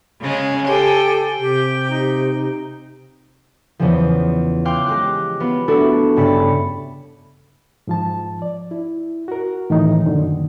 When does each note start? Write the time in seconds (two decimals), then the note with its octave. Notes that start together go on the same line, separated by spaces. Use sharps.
0.22 C#3 G#3 C#4
0.68 G4 A4 C5 G5 G#5
1.40 C3 G4 G5
1.89 D#4
3.79 E2 C#3 F3
4.65 F5 G5 C6 D6 F#6 G6
4.86 G#3 G4 F#6
5.40 B3 F4
5.68 A3 D4 E4 F#4 A4
6.16 G2 C#3 A5 B5 C#7
7.87 G#2 F3 A5
8.42 D5
8.71 E4
9.28 F#4 A#4
9.70 A2 D#3 E3 D#4
10.06 F#2 A#2 D3 D#3